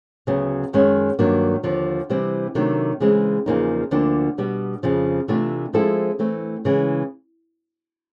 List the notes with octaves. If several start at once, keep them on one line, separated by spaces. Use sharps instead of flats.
D2 C#3 F#3 B3
F#2 D#3 G#3 C#4
G2 D#3 F#3 A#3 D4
D#2 D3 F3
C3 E3 G3 C4
C3 D#3 F#3 A3 D4
C#3 E3 G#3 C4
E2 C#3 F3 A#3 D#4
D2 D3 F3 A#3 D4
B2 G3 B3
F2 C#3 F3
C3 E3 A3 D4 F4
F3 G#3 C4 E4 A4
E3 A3 C4
C#3 E3 G#3